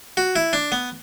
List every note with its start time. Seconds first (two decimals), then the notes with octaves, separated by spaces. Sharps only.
0.17 F#4
0.36 E4
0.53 D4
0.72 B3